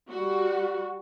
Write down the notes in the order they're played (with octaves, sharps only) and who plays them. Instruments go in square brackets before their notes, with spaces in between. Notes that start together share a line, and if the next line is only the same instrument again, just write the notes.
[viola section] G3 F#4